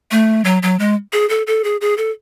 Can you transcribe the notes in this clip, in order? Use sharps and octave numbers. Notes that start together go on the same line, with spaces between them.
A3
F#3
F#3
G#3
G#4
A4
A4
G#4
G#4
A4